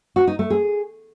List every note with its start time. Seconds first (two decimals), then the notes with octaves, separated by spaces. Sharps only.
0.16 F#4
0.27 D#4
0.39 A3
0.50 G#4